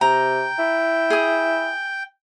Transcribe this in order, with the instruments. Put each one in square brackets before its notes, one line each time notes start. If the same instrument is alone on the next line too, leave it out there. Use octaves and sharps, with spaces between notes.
[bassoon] C3 [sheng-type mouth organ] G5 [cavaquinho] A#5
[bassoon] E4
[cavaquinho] G#4 D#6